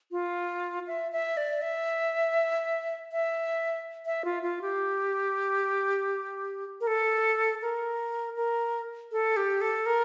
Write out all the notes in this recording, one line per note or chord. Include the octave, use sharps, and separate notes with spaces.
F4
E5
E5
D5
E5
E5
E5
F4
F4
G4
A#4
A4
A#4
A#4
A4
G4
A4
A#4